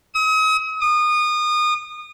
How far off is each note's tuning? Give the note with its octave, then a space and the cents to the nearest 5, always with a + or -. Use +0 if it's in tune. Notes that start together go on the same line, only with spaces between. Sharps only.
D#6 +40
D#6 -30